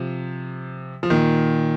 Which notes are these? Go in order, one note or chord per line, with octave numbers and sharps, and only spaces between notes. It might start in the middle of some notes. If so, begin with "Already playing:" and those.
Already playing: C3 F3
F3
A#2 D#3